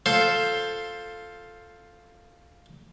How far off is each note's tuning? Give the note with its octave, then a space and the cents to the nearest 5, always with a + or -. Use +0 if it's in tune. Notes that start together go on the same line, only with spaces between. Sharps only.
F4 +0 A4 +0 C5 +10